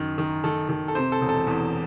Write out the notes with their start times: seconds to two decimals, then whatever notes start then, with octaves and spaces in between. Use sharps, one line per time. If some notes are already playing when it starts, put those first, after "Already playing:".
Already playing: F#2 D#3
0.18 D#3
0.44 D#3 A4
0.69 D#3 A4
0.88 A4
0.95 C3 C5
1.12 A4
1.21 E1
1.29 A4
1.47 E2